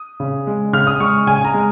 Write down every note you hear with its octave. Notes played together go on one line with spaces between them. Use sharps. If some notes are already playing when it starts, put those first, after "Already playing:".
Already playing: D#6
C#3
G#3
C#3 F6
D#6
G#3 C#6
C#3 G#5
A#5
G#3